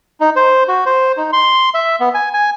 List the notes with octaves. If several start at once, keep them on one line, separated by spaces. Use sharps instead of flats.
D#4
C5
F#4
C5
D#4
C6
E5
B3
G#5
G#5